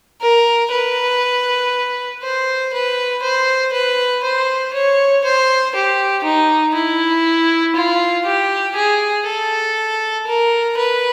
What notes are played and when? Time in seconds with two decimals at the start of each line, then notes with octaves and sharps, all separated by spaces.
0.22 A#4
0.72 B4
2.23 C5
2.73 B4
3.23 C5
3.74 B4
4.24 C5
4.74 C#5
5.24 C5
5.75 G4
6.24 D#4
6.75 E4
7.75 F4
8.26 G4
8.76 G#4
9.27 A4
10.27 A#4
10.77 B4